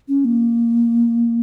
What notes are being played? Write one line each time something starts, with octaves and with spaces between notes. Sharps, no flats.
C#4
A#3